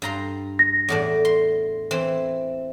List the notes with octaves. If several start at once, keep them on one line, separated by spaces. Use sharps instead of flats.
G2 A#5 C6
A#6
E2 A2 D4
C6
E3 C4